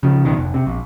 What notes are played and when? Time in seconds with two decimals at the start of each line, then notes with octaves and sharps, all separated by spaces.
0.03 C#3 F3
0.25 B1 G2 B2 D#3
0.37 F1
0.54 C3
0.67 A#1